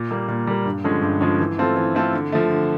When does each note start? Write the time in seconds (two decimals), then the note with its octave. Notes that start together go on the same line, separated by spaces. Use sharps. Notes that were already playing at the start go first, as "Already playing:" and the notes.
Already playing: A#2
0.11 G3 A#3
0.28 A#2
0.47 G3 A#3
0.65 G2
0.84 D3 F3 G#3 C#4
1.02 G2
1.21 D3 F3 G#3 C#4
1.40 E3
1.58 A3 C4 F4 A4
1.76 E3
1.95 A3 C4 F4 A4
2.13 D3
2.32 F3 A3
2.50 D3